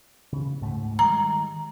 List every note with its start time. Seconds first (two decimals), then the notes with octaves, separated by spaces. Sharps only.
0.32 C#3
0.60 D2 G#2 A3
0.99 D#3 G3 G#3 A#5